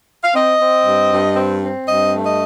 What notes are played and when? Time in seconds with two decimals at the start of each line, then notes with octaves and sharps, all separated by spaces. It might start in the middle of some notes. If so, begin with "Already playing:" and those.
0.23 F5
0.34 C4 D#5
0.61 C4
0.85 G2
1.11 G2
1.35 C4
1.61 C4
1.86 G2 D#5
2.11 A3
2.24 D#5